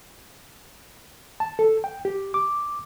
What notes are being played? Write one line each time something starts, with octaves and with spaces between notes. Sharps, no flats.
A5
A4
G5
G4
D6